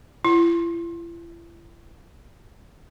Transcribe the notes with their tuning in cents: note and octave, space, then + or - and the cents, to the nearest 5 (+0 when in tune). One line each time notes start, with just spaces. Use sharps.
E4 +45